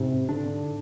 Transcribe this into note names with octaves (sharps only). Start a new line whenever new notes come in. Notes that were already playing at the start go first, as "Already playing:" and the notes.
Already playing: G#2 C3
D3 D4